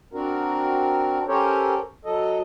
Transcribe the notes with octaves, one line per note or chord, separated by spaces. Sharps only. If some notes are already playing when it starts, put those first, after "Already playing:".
C4 D4 F#4 A#4
C#4 G4 A4 A#4 C5 C#5
F#3 A4 D#5